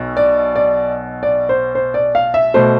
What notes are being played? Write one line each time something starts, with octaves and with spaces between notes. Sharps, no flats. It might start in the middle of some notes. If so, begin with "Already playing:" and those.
Already playing: B1 B2
D5
D5
D5
C5
C5
D5
F5
E5
B2 A3 C5